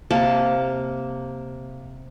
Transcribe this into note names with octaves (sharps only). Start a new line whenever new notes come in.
C3 A#3 A5